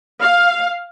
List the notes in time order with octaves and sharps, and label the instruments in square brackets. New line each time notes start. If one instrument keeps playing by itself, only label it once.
[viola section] F5